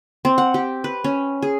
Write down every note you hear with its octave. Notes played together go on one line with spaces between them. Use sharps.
C4
F#5
G4
B4
C#4
G#4